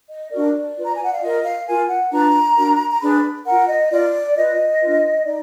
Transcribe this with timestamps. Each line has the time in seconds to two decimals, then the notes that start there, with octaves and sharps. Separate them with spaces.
0.10 D#5
0.31 D4 F#4 A#4 D5
0.77 F4 B4
0.86 A#5
0.95 G#5
1.04 F#5
1.12 F5
1.21 F4 A#4 D#5
1.44 F5
1.66 F4 A#4 G#5
1.89 F#5
2.11 D4 F4 B4 A#5
2.56 D4 F#4 A#4
2.90 A#5
3.01 D4 G#4 B4 B5
3.45 F4 A#4 F#5
3.68 D#5
3.90 F4 A#4 D5
4.35 F4 B4 D#5
4.80 D4 F4 B4
5.25 D#4 D5